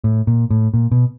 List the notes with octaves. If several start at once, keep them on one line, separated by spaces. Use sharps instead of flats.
A2
A#2
A2
A#2
B2